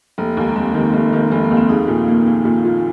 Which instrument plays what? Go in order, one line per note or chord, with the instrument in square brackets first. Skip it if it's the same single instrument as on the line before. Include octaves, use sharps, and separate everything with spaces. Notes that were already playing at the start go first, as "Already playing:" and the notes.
[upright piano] F1 [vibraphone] A#3
[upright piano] D#2 [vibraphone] G#3
[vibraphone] A#3
[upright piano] F1 [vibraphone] C4
[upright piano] D#3
F1
D#3
[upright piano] F1 [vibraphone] G#3
[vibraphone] A#3
[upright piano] D#2
[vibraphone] C4
[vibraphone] D#4 [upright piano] G#4
[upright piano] A#2
A#3
A#3
A#2
F4